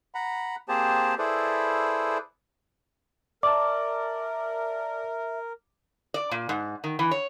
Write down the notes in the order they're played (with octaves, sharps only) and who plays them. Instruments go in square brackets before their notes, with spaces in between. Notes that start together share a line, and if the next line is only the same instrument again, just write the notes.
[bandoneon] F#5 A#5 B5
A#3 C4 G4 G#4 C5 A5
E4 G#4 A4 B4 C5 D5
[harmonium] A#4 [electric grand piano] D5 A5 [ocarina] E5 [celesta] D6
[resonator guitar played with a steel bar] D5
A#2
G#2
D#3
E3
C#5